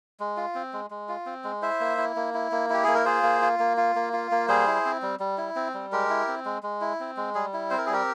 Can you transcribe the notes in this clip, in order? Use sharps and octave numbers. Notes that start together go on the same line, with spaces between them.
G#3
F4
C4
G#3
G#3
F4
C4
G#3
E4 C5 E5
A#3
E4
A#3
E4
A#3
E4 G4
A#3 G#4
A#4
F4 G#4 C5
A#3
F4
A#3
F4
A#3
F4
A#3
G3 G#4 C5
E4
C4
G3
G3
E4
C4
G3
G#3 G4 A#4
E4
C4
G#3
G#3
E4
C4
G#3
G3 G#4
E4
C4 C5
A#4
G#4
G3 G4 A#4